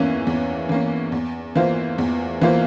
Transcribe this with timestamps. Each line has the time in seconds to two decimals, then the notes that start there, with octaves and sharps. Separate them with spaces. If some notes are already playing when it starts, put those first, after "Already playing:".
Already playing: E2 E3 A#3 C#4
0.27 E2
0.69 E3 A#3 C#4
1.12 E2
1.55 E3 A#3 F4 C5
1.98 E2
2.42 E3 A#3 F4 C5